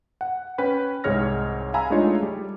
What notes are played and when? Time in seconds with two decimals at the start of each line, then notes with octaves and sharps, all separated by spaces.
0.21 F#5
0.58 C#4 B4 G5 B5
1.04 C2 G#2 G#4 C#5 F6 A#6
1.74 F5 G#5 A#5 B5 E6
1.90 G#3 A3 D4 D#4 F4 C#5
2.23 G3